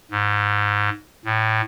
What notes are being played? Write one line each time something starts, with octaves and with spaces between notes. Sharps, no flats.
G#2
A2